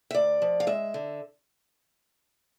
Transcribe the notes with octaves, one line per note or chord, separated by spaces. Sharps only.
E5
D2 D5
F3
F5
G#3 E5
D3